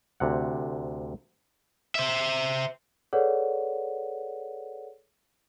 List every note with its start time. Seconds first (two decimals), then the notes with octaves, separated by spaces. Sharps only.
0.20 D2 C3 F#5
1.95 C5 E5
3.13 G#4 A4 B4 C#5 D5 F#5